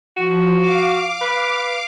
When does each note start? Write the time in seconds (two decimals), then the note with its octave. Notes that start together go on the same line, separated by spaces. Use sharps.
0.17 F3 F#4
0.56 F5 D6
1.21 B4